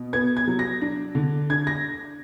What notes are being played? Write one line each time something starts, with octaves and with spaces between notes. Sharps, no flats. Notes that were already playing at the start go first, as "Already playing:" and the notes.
Already playing: B2
B3 G#6
G#6
F#3
A#6
D4
D3
D4 G#6
A#6